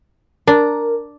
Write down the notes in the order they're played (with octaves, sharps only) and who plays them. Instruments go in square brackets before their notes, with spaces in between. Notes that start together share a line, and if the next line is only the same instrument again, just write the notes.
[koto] D4 [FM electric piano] A#4